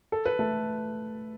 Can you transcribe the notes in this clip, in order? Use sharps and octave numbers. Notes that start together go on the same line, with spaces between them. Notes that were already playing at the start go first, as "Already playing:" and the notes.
A4
B4
A3 A4